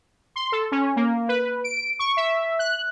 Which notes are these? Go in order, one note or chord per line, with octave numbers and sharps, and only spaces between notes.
C6
A4
C#4
A#3
B4
D7
C#6
E5
F#6